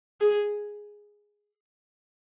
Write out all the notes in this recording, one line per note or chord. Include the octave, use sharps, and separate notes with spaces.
G#4